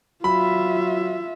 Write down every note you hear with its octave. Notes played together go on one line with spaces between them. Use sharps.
F#3 F4 E5 B5